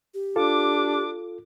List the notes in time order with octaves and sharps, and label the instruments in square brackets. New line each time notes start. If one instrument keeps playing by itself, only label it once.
[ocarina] G4
[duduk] D4 [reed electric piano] F4 A4 [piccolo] D6